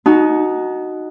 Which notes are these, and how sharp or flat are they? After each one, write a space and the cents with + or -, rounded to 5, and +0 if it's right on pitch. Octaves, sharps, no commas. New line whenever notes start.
D#4 +0 F#4 +0 A5 -35